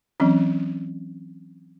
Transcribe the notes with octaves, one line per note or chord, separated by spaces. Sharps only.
E3 F#3 C4 C#4